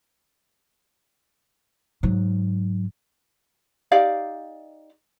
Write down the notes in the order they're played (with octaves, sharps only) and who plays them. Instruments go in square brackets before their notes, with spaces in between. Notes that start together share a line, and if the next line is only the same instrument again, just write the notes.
[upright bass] G#2 F#3
[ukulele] D#4 G4 D5 F5